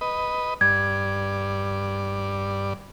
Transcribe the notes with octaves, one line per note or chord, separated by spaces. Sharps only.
B4 D#5
G2 D5 G#6